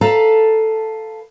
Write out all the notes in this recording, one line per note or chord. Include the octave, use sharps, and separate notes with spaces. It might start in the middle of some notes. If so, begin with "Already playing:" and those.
A4 B4 F5 A5 A#5